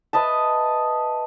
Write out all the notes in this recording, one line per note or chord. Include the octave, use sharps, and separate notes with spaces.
B4 D#5 E5 A5